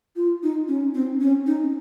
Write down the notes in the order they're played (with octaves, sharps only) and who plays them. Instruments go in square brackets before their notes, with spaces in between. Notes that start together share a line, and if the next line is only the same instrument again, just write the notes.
[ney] F4
D#4
C#4
C4
C#4
D#4